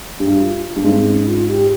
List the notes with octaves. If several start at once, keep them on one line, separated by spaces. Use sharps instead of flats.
G2 G4
F4
G2
G#2 C4
C#4
F4
G4